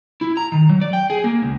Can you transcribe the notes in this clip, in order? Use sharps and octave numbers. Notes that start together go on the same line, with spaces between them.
E4
A#5
D#3
F#3
D5
G5
G#4
A#3
C#2